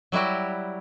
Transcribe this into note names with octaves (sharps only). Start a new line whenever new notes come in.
F#3 G3 E4 F#4 G4